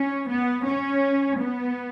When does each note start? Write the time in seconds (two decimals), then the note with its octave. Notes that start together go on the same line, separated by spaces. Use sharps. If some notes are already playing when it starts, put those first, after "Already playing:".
Already playing: C#4
0.28 B3
0.66 C#4
1.40 B3